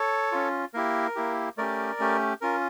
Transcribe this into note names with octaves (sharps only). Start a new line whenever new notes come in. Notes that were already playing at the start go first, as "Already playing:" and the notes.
Already playing: A4 C#5
C#4 F4
A#3 E4 G4 A#4
A#3 E4 G4
A3 C#4 G4 A#4 D5
A3 C#4 G4
C#4 F4 A#4